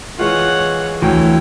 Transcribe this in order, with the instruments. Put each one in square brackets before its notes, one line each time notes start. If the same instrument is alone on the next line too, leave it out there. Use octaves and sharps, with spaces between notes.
[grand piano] E3 G#3 F4 [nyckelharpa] C#5 F#5
[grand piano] D2 F#3 [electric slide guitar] E3 [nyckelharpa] G5